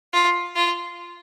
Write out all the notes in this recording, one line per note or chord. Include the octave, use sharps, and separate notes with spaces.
F4
F4